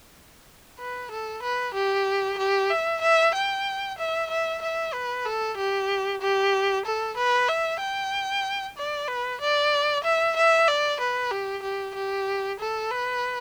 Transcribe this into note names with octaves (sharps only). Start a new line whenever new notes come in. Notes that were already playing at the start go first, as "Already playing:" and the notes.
B4
A4
B4
G4
G4
E5
E5
G5
E5
E5
E5
B4
A4
G4
G4
A4
B4
E5
G5
D5
B4
D5
E5
E5
D5
B4
G4
G4
G4
A4
B4